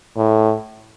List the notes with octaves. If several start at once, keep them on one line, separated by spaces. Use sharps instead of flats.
A2